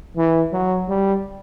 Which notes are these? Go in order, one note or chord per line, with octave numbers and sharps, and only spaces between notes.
E3
F#3
G3